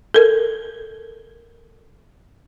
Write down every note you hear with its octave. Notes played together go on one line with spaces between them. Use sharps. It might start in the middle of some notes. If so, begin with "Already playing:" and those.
A4 A#4